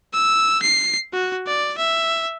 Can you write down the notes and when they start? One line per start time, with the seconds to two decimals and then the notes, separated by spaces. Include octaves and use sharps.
0.13 E6
0.62 C7
1.13 F#4
1.47 D5
1.78 E5